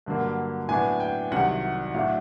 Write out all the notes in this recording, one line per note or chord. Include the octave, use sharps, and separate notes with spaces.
G2 D3 F#3 A#3
A2 F#3 B3 D4 G#5
G5
C2 C3 D#3 F#3 F#5
A2 F#3 A3 D4 F5